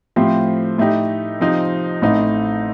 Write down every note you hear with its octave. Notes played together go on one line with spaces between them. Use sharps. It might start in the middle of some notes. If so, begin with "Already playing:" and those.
A2 F3 A3 C4 G4
A2 A3 D#4 G4
C3 F3 C4 D#4
A1 A2 A3 C4 D#4